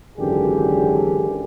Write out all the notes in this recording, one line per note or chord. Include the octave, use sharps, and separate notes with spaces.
G#1 F#2 D3 E3 G4 G#4